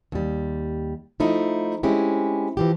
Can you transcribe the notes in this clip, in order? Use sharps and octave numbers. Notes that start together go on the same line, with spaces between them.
D#2 G3
F3 A3 D#4 E4
G#3 C4 C#4 E4 G4
E3 F3 G4